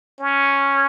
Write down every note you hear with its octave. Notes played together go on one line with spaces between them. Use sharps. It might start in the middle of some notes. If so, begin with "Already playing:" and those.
C#4